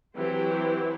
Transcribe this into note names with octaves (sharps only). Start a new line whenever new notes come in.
E3 F#3 C4 E4 G4 C5